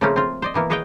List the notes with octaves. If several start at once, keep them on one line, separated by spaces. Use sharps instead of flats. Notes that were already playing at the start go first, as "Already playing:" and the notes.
C#3 F3 A3 A#3 C4 C#4
C4 F4
C5 D5 D#5
B2 E3 A#3 B3
G#4 B4 C#5 D#5 F5 G5